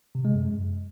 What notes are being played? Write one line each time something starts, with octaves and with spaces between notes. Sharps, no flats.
C3
G#3
F#2